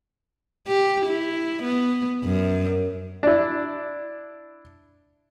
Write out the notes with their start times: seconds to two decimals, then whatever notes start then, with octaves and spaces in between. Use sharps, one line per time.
0.67 G4
1.06 E4
1.63 B3
2.24 F#2
3.23 D4 E4